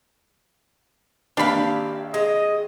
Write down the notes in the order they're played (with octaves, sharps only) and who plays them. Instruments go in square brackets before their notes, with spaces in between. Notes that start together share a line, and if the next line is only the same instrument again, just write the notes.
[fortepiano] G#1 A#3 [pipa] D4 B5 [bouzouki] G4 F5
[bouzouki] G#3 [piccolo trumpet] D#5